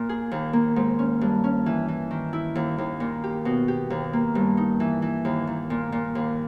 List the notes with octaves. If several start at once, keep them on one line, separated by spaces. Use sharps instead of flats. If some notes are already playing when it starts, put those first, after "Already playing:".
Already playing: A#2
G#4
D#2
A#3
G#2
C#4
G2
C#4
E3
E3
D#3
E4
D#2
D#2
A#2
G4
B2
G4
D#2
A#3
G2
D#4
E3
E3
D#2
D#2
A#2
A#2
D#2